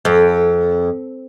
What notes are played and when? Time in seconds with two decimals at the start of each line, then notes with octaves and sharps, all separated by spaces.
0.05 F2